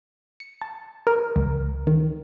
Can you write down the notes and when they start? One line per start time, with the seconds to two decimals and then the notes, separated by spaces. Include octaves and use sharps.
0.40 C#7
0.61 A5
1.07 A#4
1.36 C#2
1.87 D#3